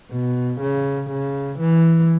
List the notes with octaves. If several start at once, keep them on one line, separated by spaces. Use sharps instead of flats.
B2
C#3
C#3
E3